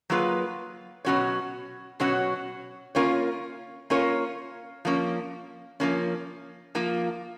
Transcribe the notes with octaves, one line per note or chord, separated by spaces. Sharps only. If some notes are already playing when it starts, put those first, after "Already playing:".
F#3 A#3 F4 G#4 B4
B2 F#3 C#4 F#4 C#5
B2 F#3 C#4 F#4 C#5
A#3 C#4 F4 A#4 C#5
A#3 C#4 F4 A#4 C#5
F3 A#3 C#4
F3 A#3 C#4
F3 A#3 F4